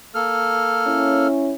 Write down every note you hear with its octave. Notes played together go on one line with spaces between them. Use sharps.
A#3 A4 F6
C#4 E4